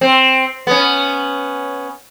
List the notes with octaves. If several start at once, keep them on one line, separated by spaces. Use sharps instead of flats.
C4
B3 C#4